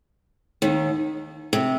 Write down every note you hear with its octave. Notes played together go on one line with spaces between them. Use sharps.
D#2 D#3
C3